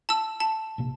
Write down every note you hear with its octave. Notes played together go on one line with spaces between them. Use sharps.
A5 E6
A5
A#1 C3 A#3